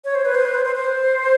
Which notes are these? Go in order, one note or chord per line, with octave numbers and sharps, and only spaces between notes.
C#5
C5
B4
C5
B4
C5
C5
C5